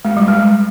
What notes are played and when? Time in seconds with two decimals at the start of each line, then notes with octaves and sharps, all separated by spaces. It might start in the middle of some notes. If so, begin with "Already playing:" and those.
0.05 G#3
0.17 G3
0.28 G#3